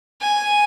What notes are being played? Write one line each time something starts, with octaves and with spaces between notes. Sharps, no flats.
G#5